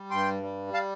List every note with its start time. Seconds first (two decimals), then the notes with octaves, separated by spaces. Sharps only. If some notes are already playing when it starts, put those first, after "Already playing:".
Already playing: G3
0.11 G2 G5 C6
0.43 G3
0.74 F5 A5